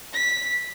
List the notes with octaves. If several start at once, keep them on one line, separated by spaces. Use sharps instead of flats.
B6